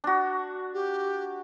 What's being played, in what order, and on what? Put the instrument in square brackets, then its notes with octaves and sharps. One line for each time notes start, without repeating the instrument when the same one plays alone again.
[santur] D4 F#4
[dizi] G4